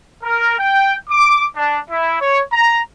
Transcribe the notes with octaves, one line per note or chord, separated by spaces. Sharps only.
A#4
G5
D6
D4
E4
C#5
A#5